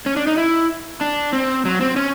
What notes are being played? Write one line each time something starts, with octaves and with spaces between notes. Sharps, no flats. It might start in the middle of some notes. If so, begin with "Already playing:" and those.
C#4
D4
D#4
E4
D4
C4
F#3
C4
C#4